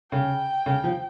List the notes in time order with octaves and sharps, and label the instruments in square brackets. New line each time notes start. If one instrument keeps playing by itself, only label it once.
[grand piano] C#3 [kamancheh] G5
[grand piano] C#3
F3